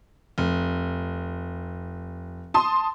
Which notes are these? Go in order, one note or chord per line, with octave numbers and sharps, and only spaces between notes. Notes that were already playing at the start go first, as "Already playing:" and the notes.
F1
A5 C6 D#6